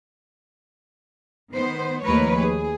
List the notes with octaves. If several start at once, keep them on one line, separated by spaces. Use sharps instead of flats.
D#3 B3 C5
D#2 F3 A3 A#4 B4 C#5
G#4